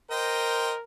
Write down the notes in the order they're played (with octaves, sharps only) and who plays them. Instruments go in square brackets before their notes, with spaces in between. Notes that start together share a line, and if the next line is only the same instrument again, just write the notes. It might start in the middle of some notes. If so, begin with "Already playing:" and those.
[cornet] A#4 [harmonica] C5 D#5 G5